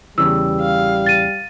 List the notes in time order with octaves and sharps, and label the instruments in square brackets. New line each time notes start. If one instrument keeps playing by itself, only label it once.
[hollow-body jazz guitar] E2 C#3 E3 [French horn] G3 [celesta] E6
[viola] F5
[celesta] A6 D#7